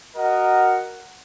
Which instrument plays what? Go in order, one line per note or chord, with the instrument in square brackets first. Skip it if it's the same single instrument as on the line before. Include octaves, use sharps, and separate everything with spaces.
[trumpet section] F#4 A#4 D#5 F#5